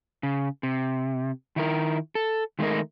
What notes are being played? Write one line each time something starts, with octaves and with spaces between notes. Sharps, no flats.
C#3
C3
D#3 E4 A#4
A4
D#3 G#3 A3 D#4 A#4